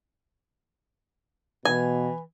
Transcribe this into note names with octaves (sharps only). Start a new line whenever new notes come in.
B2 E3 G#5